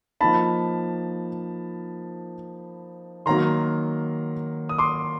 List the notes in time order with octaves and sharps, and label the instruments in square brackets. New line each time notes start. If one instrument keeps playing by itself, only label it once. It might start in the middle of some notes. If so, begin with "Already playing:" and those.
[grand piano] F3 A#3 D#4 A5 B5
D#3 F#3 A#3 A#5 C6
D#6
C6 D6